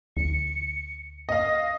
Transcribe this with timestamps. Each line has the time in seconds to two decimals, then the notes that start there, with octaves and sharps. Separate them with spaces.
0.17 D2 C#7
1.29 D#5 F5 A#6